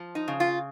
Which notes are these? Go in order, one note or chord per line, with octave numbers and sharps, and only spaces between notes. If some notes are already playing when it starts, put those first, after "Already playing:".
Already playing: F3
D#4
C#3
F4